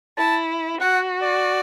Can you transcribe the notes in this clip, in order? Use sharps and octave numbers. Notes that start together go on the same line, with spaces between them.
E4 A5
F#4 F#5
D5